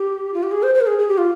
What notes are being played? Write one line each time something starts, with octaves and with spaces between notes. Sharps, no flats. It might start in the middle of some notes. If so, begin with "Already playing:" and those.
Already playing: G4
F4
G4
G#4
C5
C5
A#4
G#4
G#4
G4
F4